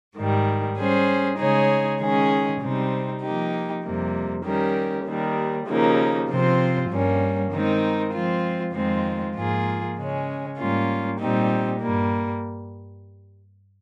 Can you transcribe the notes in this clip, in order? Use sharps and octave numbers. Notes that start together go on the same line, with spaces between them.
G#2 D#3 G3
G3 C#4 G#4 C5
C#3 G#3 D#4 G#4 C#5
D#3 G#3 C#4 G#4
C3 G3 C4 D#4
F3 A#3 D#4 G4
F2 C3 G3 A#3
D#3 G3 C#4 G4 A#4
D#2 D#3 G3
D#2 C#3 F3 A#3 D#4
C3 F3 C4 F4 C5
G2 G3 A#3 C#4
D#3 G#3 C4 D#4 A#4
F3 G#3 C4 F4
F2 D#3 G#3 C4 F4
G#2 F3 A#3 F4 G#4
C#3 G#3 C#4
G#2 G3 A#3 C#4 F4
A#2 G3 C4 D#4 G4
G2 G3 A#3